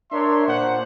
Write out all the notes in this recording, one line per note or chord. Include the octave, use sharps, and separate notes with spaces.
D4 A#4 C#5 E5 C6
A#2 C5 F#5